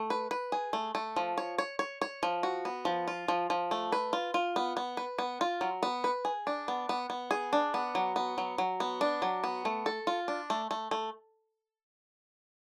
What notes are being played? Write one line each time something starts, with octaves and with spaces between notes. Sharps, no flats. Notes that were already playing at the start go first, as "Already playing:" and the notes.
Already playing: A3
B4
B4
G#4
A3
A3
F3
C#5
C#5
C#5
C#5
F3
F#4
B3
F3
F4
F3
F3
A3
B4
F4
F4
B3
B3
B4
B3
F4
F#3
B3
B4
G#4
D4
B3
B3
B3
G#4
D4
B3
F#3
B3
F#3
F#3
B3
D4
F#3
B3
A3
A4
F4
D4
A3
A3
A3